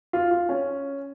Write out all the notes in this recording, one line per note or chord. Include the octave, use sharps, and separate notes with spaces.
F4
F4
C#4